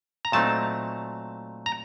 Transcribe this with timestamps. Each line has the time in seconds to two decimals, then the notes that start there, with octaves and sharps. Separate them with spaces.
0.25 A#5
0.32 A#2 F#3 A3 C4 D#4 A5
1.66 A#5